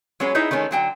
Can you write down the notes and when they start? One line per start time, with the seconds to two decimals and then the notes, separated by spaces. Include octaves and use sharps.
0.20 F#3 G#3 C#4 G#4 B4
0.35 D#4 E4 G#4 B4 D#5 E5
0.51 D#3 G#3 A3 C#4
0.71 D3 F#3 G5